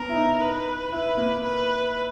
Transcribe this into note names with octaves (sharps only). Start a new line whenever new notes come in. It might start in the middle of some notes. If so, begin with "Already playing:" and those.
Already playing: B3 C#4 A#4
E4
D#4
B4
E4 B4
A#3
B4